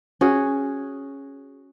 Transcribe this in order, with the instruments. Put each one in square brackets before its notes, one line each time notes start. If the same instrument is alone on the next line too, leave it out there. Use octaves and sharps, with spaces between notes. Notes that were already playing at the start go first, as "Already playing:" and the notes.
[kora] C#4 F#4 G#4